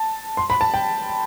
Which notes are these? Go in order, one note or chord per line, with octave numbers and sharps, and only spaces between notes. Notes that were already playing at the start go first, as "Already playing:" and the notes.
Already playing: A5
C6
B5
A5
G5